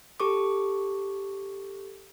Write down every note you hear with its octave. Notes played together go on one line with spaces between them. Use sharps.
G4 A4 C#6 D6